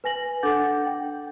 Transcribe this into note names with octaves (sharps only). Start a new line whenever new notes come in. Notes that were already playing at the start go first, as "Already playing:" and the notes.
B4 G#5 A#6 F#7
D4 A4 F#5 D6 G6 A6
G5